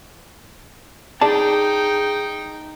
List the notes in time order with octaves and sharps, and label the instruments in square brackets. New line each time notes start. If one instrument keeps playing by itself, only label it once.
[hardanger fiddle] D#4 G5 [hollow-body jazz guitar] G#4 D5 A5